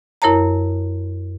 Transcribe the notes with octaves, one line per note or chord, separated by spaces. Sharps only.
F#2 E4 A#4 C#5 A5 A#5